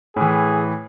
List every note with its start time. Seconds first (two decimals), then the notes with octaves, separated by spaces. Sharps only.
0.16 A2 E3 G#4